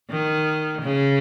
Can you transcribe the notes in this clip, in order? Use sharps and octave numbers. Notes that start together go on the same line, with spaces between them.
D#3
C#3